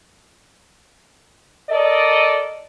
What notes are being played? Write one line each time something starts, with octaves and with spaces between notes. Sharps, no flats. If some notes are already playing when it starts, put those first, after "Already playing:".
A4 A#4 D5 D#5